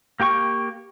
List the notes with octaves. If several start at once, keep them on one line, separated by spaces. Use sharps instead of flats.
A#3 G4 G5 C#6